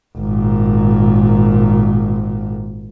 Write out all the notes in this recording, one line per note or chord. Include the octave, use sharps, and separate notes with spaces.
G#1 A#2